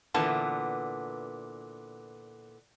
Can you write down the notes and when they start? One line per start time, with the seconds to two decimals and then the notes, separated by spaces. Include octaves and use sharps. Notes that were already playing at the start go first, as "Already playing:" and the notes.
0.14 A#2 D3 E3 B3 A5